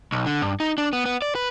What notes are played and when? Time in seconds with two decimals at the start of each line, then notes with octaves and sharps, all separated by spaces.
0.12 B1
0.26 D3
0.42 G2
0.60 D#4
0.78 D4
0.93 B3
1.06 B3
1.22 D5
1.35 B4